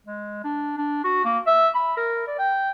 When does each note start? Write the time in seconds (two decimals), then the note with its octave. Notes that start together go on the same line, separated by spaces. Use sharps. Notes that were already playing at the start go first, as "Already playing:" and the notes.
0.06 G#3
0.44 D4
0.77 D4
1.04 F#4
1.25 A#3
1.47 E5
1.75 B5
1.97 A#4
2.27 D5
2.39 G5